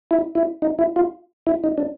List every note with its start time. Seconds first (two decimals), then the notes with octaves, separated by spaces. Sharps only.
0.11 E4
0.35 E4
0.62 D#4
0.79 E4
0.96 F4
1.47 E4
1.64 D#4
1.78 D4